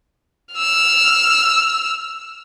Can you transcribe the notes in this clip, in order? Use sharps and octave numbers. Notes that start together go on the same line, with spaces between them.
E6 F6